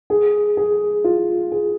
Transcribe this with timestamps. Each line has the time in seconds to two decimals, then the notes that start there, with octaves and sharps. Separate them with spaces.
0.10 G#4
0.57 G#4
1.04 F4
1.52 G#4